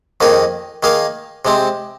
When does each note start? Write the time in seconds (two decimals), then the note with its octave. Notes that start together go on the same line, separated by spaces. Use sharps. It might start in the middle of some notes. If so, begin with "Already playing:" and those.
0.21 F2 D#3 A#3 G#4
0.83 D#3 A#3 G#4 F5
1.45 C3 G#3 C4